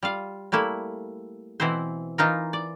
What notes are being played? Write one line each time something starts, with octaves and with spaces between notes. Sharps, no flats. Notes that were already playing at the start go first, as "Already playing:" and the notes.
G3 F4 F5
G3 A3 A#3 E4
B2 E3 C4 E4 C5
E3 D#4 F4 A#4
D5